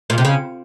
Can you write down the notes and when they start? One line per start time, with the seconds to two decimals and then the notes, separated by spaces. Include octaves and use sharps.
0.10 A#2
0.18 C3
0.25 C#3